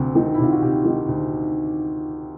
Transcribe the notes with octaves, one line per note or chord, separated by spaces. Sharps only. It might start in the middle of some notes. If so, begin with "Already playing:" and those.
Already playing: D2 C3 G4
D#3
E4
C3 F4
F#4
C3 G4
D#3
D2